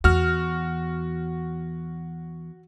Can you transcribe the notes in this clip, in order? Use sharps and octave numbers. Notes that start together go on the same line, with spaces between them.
E2 F#4 F6